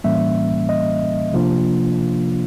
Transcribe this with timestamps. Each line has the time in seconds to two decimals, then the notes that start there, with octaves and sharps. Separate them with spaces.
0.04 A2 E3 G3 A#3 C#4 E5
0.69 D#5
1.33 C3 F3 A#3 D4 F4